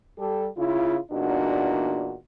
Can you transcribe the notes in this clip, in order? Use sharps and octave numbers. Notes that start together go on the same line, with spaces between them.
G3 G4 A4
C#3 E4 F4
E2 A#2 D4 D#4 F#4